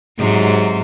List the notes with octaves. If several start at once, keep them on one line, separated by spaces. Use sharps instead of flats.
G#2 C3 F#3